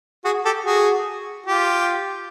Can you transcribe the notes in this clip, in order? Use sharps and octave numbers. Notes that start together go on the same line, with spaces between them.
F#4 G#4
G4 A4
F#4 G#4
F4 G4